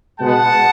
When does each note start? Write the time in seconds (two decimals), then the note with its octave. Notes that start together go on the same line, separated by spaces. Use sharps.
0.19 B2 G#3 B3 F#5 A5